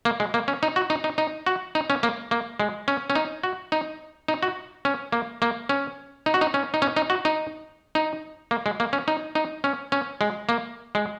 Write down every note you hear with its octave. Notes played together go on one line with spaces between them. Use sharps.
A#3
G#3
A#3
C#4
D#4
F#4
D#4
D#4
D#4
F#4
D#4
C#4
A#3
A#3
G#3
C#4
C#4
D#4
F#4
D#4
D#4
F#4
C#4
A#3
A#3
C#4
D#4
F#4
D#4
C#4
D#4
C#4
D#4
F#4
D#4
D#4
A#3
G#3
A#3
C#4
D#4
D#4
C#4
C#4
G#3
A#3
G#3